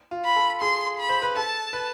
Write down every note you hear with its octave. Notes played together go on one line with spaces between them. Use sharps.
F4
B5
A4
G#4 C6
B5
C5
B4
A4 A5
B4